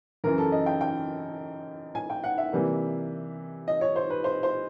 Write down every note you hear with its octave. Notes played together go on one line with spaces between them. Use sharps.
F#2 C#3 E3 A#4
A4
D#5
G5
G5
G#5
G5
F#5
E5
C3 E3 G3 A#3
D#5
C#5
C5
B4
C5
C5